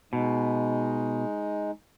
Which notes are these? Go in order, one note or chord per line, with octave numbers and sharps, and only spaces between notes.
B2 G#3 D#4